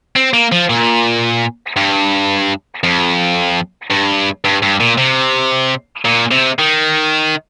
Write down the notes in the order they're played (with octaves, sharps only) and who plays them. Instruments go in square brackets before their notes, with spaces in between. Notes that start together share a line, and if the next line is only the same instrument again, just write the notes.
[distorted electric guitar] C4
A#3
F3
A#2
G2
F2
G2
G2
G2
A#2
C3
A#2
C3
D#3